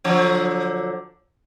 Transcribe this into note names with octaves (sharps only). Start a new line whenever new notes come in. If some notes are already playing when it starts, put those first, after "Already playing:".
D3 F3 F#3